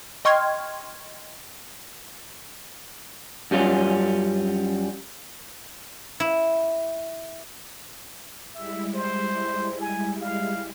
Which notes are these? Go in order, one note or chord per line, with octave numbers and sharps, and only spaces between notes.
D#5 G5 C6 C#6 F6 G#6
F#2 G3 C#4 F4
E4
G3 G#3 E4 E5
C5
G#5
F5